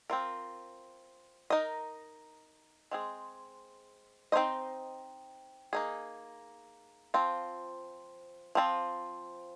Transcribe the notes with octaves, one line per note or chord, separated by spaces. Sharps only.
C4 F4 A#4
D#4 A#4 D#5
G#3 C4 G#4
C4 D#4 C5 D#5
A#3 D#4 G#4
F3 C4 F4
F3 C4 F4